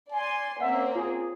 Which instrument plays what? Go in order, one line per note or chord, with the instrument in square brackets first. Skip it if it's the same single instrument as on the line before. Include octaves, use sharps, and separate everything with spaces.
[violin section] D5 C6 [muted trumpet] G#5
[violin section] A#3 C4 C#4 [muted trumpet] E5 [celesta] F#5
[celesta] F4 [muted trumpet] G#4